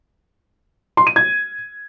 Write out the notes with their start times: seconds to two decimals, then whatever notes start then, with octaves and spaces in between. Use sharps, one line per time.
0.97 C6
1.07 D#7
1.16 G#6